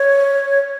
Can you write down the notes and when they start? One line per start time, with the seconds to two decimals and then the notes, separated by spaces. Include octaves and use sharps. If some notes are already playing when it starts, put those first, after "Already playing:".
Already playing: C#5